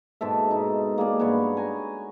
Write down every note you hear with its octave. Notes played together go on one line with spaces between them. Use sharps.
G#2 B2 A4 E5
D#4
A#3 G#4 D5
G2 B3 C#5 F#5
G#5 A#5